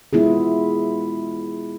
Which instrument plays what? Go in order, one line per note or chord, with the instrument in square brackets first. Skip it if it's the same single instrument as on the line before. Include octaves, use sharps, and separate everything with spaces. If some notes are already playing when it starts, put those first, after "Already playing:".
[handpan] G#3 B3 E4 F4 G#4